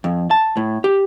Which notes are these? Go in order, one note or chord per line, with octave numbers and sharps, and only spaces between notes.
F2
A5
A2
G4